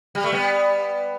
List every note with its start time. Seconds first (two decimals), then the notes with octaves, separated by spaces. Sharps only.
0.15 G3
0.24 A3
0.32 G3 B3